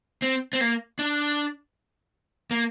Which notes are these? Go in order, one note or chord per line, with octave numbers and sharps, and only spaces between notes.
C4
C4
A#3
D4
A#3